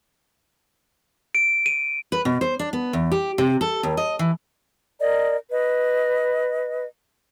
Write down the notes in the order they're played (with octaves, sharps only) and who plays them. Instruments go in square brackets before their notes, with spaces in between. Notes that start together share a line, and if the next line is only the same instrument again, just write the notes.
[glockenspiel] D7
D#7
[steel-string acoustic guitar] B4
B2
C5
D4
B3
E2
G4
C3
A4
D#2
D#5
E3
[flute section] A#4 D5 D#5
B4 D#5